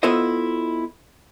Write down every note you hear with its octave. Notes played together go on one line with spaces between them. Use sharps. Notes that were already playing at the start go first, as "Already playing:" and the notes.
B3 E4 F4 A4 C5 D#5